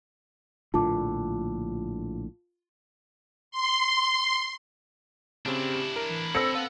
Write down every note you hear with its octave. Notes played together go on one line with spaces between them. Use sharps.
A#1 A2 D3 F4 A5 D6
C6
C#3 C4 D4 E4 G4
A#4
E3
C4 A4 C5 E6 A#6 C#7
B4 F5 F#5